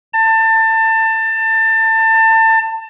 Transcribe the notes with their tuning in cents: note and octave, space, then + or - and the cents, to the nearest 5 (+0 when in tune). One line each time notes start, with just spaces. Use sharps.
A5 +25